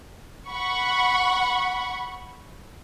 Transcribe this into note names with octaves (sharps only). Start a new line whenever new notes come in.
F#5 B5 C#6